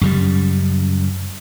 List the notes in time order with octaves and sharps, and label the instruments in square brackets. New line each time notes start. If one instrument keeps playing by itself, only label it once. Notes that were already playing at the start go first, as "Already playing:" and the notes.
[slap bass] F#2 C#3 G3